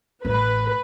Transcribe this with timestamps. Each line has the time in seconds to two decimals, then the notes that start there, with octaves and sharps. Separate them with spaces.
0.25 A1 B4